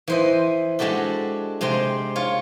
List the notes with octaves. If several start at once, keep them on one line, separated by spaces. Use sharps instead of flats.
E3 C5 D#5
G#3 D4 F#4 G4 A4
C3 G#3 C5 G5
F4 C#5